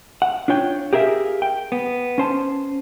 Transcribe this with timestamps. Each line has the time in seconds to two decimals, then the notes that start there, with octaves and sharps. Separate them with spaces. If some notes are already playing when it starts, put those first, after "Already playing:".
0.22 F#5
0.48 D4 F4 C#5 G5
0.93 G4 G#4 A#4 E5 F5
1.42 G5
1.72 B3
2.18 C#4 C5 A5